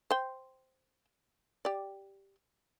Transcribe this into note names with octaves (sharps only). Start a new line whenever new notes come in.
C5 G5
G4 D5